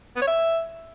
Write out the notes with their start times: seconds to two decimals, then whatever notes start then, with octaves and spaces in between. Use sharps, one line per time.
0.16 B3
0.22 C#5
0.27 E5